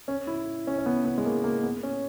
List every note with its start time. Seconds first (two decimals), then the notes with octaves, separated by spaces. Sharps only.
0.08 C#4
0.27 E4
0.67 C#4
0.78 C#4
0.86 B3
1.05 B3
1.18 G#3
1.25 A#3
1.44 A#3
1.63 B3
1.83 C#4